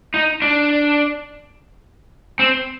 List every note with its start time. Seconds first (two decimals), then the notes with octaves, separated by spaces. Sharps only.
0.14 D#4
0.42 D4
2.39 C4